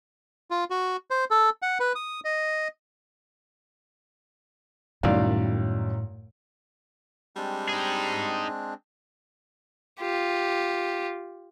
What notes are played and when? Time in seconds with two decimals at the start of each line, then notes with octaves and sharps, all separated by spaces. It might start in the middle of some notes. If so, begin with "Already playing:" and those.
0.51 F4
0.70 F#4
1.10 C5
1.31 A4
1.62 F#5
1.80 B4
1.95 D#6
2.25 D#5
5.03 C2 F#2 A2 D#3 D5 F5
7.36 G3 G#3 C4 D4
7.69 D#4 G#4
10.01 F4 G4